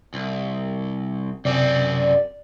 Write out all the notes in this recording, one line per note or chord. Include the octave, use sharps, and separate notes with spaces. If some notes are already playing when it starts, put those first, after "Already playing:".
C2
F#2 C3 C4 D5